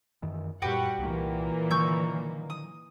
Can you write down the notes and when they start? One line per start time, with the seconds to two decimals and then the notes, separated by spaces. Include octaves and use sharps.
0.22 F#2 D#3 E3
0.62 F#2 A#2 G3 F#4 G4 B4 F#5
0.99 C2 A#2 E3 A#3
1.71 D3 D#3 F#3 C#6 E6 G6
2.50 D#6